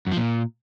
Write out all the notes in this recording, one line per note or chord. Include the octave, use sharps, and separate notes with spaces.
F#2
F3
A#2